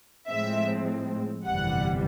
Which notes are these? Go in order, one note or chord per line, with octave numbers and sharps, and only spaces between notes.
A2 F3 G#3 C4 E5
G1 F2 C3 E3 G3 F#5